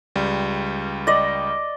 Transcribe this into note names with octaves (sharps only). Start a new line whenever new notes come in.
C#2 G3
D5 D#5